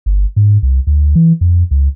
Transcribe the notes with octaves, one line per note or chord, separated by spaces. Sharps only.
G1
G#2
C2
D2
E3
F2
C#2